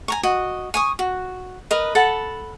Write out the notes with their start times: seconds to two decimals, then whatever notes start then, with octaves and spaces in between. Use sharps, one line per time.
0.08 G#5 A#5 C#6
0.23 F#4 D#5
0.74 G#5 C#6 D#6
0.99 F#4
1.71 A#4 B4 D#5
1.95 A4 F#5 A5 B5